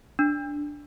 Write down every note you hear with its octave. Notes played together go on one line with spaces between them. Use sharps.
D4